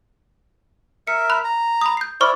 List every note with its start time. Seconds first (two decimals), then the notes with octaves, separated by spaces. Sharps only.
1.07 A#4 E5 C#7
1.30 B5 F#6
1.44 A#5
1.81 B5 D#6
1.97 G6 C7
2.21 E4 C5 D5 C#6 F6